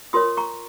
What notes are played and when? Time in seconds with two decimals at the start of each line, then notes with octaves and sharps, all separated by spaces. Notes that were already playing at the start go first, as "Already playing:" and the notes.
0.13 F4 A#4 C#5 C6 D#6
0.37 A#5 C#6